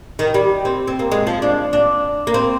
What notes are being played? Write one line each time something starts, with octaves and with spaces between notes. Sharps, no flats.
D#3
G3
C4
C4
A#3
G#3
F3
D4
D4
A#3
C4